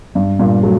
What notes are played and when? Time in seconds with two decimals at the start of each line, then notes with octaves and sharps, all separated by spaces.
0.15 G2
0.39 G2 A#2
0.63 F#3 A3